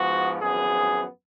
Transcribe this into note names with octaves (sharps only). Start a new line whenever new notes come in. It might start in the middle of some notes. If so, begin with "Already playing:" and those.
Already playing: G#2 F3 G#3 B3 F#4
G#1 F#2 F3 B3 G#4